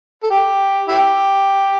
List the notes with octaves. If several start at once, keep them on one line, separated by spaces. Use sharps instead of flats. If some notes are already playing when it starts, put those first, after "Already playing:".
A4
G4
E4 G4